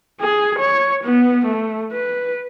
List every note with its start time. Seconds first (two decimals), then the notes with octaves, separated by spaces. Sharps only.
0.21 G#4
0.59 C#5
1.04 B3
1.46 A3
1.93 B4